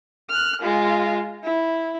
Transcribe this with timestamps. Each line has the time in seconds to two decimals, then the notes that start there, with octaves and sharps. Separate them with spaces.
0.29 F6 F#6
0.62 G#3 F4
1.44 E4